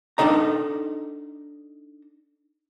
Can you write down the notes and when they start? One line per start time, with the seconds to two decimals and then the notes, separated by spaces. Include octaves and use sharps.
0.18 D4 D#4 A4 D#5 A#5